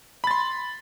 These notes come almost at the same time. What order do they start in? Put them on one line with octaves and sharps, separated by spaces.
B5 A6 C6